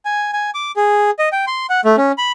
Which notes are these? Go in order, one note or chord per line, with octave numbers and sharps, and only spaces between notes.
G#5
G#5
D6
G#4
D#5
G5
C6
F#5
A3
C#4
B5